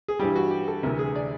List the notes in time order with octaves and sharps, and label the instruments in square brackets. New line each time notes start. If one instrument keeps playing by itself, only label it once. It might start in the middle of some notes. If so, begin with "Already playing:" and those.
[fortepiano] G#4
G2 E3 G3 G4
F#4
G4
A4
D2 C3 E3 A3 A#4
G#4
D5